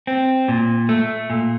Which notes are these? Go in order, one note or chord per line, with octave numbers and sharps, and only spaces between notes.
C4
A#2
A3
A#2